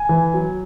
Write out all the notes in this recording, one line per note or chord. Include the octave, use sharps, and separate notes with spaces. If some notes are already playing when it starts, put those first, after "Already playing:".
Already playing: G#5
E3
F#3